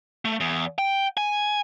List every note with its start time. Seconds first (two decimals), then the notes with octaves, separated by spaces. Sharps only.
0.25 A3
0.40 E2
0.78 G5
1.17 G#5